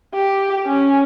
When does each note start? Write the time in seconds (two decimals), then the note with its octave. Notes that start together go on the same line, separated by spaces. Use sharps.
0.14 G4
0.66 C#4